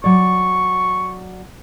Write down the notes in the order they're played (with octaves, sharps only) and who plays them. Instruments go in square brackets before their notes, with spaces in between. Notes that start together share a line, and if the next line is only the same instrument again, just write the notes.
[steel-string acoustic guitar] F#3 D5 [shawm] C#6